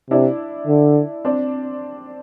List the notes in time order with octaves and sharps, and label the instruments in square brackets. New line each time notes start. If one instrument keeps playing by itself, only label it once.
[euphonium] C3 [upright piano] D4 E4
[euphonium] D3
[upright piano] C4 D4